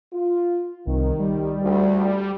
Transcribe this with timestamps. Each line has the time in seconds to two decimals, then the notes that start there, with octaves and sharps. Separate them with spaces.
0.13 F4
0.87 C2 D#3
1.19 G3
1.62 D2